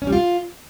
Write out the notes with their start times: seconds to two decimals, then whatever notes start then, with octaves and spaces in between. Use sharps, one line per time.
0.02 C#4
0.07 G3
0.13 F4